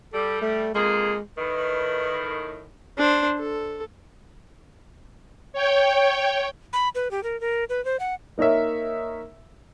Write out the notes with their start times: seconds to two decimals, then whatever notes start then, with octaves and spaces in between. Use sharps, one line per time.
0.13 G3 A4
0.42 A3
0.75 F2 G#3 A#3 G#4
1.38 A2 D#3 B4
2.98 D4 C5
3.39 A4
5.53 C#5 G5
6.73 B5
6.95 B4
7.11 G4
7.23 A#4
7.41 A#4
7.69 B4
7.85 C5
8.00 F#5
8.38 A#3 D#4 A#4 C#5 E5